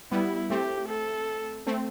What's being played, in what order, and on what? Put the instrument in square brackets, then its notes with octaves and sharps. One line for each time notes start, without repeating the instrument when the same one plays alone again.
[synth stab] G3 B3 [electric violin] E4
[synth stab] A3 C4 [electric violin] G4
[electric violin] A4
[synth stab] A3 C4